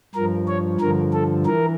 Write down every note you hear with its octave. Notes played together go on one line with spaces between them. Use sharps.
G2 F3 A#4
C#5
G2 D3 F3 A#4
A4
E3 A#4